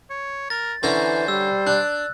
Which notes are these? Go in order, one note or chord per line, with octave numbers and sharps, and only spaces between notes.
C#5
A#4 A6
D3 E3 C#4 C5 A#5
G3 E6
D4 F#6